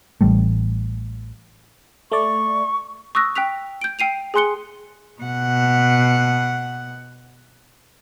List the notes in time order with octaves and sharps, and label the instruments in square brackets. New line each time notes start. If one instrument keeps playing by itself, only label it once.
[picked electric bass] A1 G3 A3
[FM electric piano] A3 D5 [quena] C#6
[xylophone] C#6 D#6 E6 F#6 A#6
G5 F#6 B6 F7
G6 D7
G5 C7 D#7 F7
G#4 G#5 C6 F#6 C#7 G7
[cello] B2 F#5